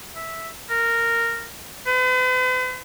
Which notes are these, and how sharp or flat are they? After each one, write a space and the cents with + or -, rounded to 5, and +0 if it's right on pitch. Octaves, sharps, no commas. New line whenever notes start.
E5 -5
A#4 -10
B4 +45